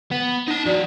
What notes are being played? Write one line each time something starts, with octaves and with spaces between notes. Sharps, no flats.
B3
D#4 A5
F3 F#4 D5